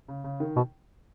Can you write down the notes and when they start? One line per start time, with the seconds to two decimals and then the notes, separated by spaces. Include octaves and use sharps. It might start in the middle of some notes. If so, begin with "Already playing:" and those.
0.08 C#3
0.24 C#3
0.40 D#3
0.56 B2